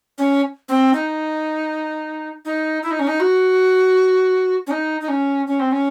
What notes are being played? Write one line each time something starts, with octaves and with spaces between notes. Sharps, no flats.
C#4
C4
D#4
D#4
E4
D#4
C#4
D#4
F#4
C#4
D#4
D#4
C#4
C#4
C4
C#4